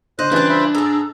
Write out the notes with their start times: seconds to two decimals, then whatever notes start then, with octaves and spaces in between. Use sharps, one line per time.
0.19 D3 C5 D#5 F#6
0.32 C#3 E3 G3 D4 F4 B4
0.49 C5 E5 B5
0.75 G#2 G#4 A4 A#5 E6